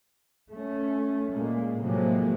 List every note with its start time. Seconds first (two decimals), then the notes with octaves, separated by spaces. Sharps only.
0.50 A3 C#4
1.33 A#2 G#3 A#3
1.79 A2 C3 F3 F#3 G#3 A#3